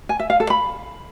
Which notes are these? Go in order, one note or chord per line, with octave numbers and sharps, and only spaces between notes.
G#5
E5
F5
A4
B5